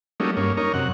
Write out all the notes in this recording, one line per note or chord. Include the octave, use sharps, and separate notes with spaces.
F#3 G3 A3 A#3 C#4 D#4
G2 A#3 C#4
D#4 A#4 C#5
F#2 C3 F#5